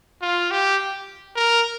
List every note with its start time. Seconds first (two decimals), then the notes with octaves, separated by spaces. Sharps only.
0.22 F4
0.51 G4
1.36 A#4